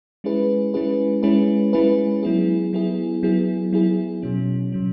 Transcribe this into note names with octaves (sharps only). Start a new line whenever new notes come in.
G#3 C#4 E4 G#4 B4
G#3 C#4 E4 G#4 B4
G#3 C#4 E4 G#4 B4
G#3 C#4 E4 G#4 B4
F#3 B3 E4 G#4
F#3 B3 E4 G#4
F#3 B3 E4 G#4
F#3 B3 E4 G#4
B2 F#3 C#4
B2 F#3 C#4